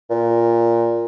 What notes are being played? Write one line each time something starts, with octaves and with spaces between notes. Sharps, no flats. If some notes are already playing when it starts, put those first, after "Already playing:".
A#2